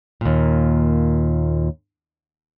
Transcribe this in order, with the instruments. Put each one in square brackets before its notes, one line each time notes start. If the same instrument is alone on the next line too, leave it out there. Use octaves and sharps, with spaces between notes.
[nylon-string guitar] D#2 A#2